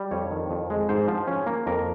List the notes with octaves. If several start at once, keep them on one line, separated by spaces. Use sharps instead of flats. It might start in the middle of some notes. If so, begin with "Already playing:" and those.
Already playing: G3
F2 C#5
D#3
F2
G#3
G#2 C5
F3
C#4
A#3
F2 A#4